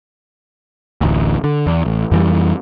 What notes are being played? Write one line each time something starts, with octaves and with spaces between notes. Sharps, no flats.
D1 A1 D2
D3
E2
A1
F2 E3 G3